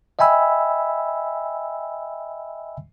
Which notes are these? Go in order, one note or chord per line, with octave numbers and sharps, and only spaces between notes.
D#5 E5 G5 G#5 B5 E6